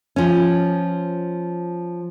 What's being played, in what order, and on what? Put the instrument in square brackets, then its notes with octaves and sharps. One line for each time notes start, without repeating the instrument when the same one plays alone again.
[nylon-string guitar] F3 C#4